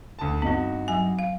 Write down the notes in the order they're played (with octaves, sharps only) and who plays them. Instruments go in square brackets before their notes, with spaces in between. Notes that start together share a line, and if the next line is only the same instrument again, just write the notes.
[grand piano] D2 A5
[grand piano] G2 D#4 F#4 [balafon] B3 C4
[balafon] F#3 G#5
F5